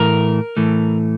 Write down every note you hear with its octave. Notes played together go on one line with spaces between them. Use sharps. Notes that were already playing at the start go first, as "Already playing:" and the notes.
Already playing: A2 E3 A3 A#4
A2 E3 A3